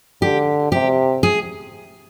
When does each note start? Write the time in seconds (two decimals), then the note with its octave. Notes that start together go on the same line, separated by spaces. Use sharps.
0.22 D3 G4
0.72 C3 G4
1.23 G#4